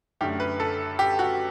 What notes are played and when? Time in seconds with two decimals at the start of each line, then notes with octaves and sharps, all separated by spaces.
0.21 F#2 D3 A3 G4
0.40 B4
0.60 A4
0.99 G4
1.19 F#4